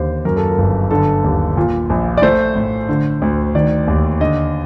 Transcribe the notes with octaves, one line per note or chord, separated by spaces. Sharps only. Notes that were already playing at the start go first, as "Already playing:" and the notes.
Already playing: D#2 D3 C5
F#2 A#4
A4
A#4
G1
D3 A4
D#2
A#2
A#1
D5
A3 C5
A2
D3
D2
D#3 D5
D#2
D3 D#5